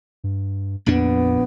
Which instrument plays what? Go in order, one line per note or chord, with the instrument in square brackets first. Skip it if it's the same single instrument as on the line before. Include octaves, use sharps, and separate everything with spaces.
[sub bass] G2
[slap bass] A#1 A#2 D4 [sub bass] F2 [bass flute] B3